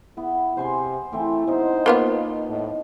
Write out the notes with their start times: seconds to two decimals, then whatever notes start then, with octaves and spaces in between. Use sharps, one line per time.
0.17 B3 E4
0.57 C3 C5 G#5 C6
1.13 E3 A3 C4
1.47 B2 D#4 C5
1.86 A#3 B3 F4
2.48 A2